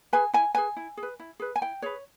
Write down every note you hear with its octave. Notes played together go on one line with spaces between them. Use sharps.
G#4 B4 G#5
E4 G#5
G#4 B4 G#5
E4
G#4
B4
E4
G#4 B4
G#5
E4 G5
G#4 B4 C#5